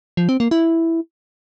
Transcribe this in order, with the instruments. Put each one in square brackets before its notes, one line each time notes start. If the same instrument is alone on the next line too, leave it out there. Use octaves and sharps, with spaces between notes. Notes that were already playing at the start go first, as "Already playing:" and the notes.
[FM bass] F3
C4
A#3
E4